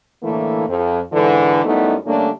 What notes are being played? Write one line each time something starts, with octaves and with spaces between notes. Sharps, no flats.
A2 D3 E3 A3 A#3
F2
G#2 D3 E3
F#2 G3 A3 B3 D#4 E4
D3 G3 A3 A#3 C#4 D4